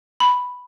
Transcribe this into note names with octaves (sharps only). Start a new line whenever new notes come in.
B5